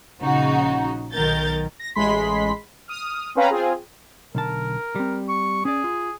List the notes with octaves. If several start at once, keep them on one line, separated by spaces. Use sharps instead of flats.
A#1 C#3 D#4 F#4
B1 D#3 F#3 A#4 G6 A6
A#6
A1 G#3 B5 C6 B6
D#6 F6
C4 C#4 B4 F5 A#5 B5
C4 F4 G#4
B1 D3 A#4 A5
G3 C4
C#6
C#4 G#4 D5
F4